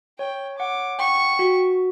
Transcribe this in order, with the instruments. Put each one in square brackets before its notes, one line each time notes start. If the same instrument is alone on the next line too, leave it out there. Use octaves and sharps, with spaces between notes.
[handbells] C#5 [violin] G5
[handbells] F#5 [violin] D6
[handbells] G5 [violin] C#6
[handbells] F#4